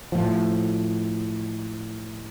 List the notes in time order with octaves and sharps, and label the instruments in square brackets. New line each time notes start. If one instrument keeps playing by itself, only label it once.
[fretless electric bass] A2 F3